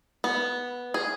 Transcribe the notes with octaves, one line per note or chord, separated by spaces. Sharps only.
B3
G#4